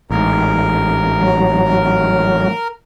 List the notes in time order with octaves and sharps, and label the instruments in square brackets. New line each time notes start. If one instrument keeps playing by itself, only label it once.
[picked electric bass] A1 G#2 [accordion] A#4
[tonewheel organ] F#3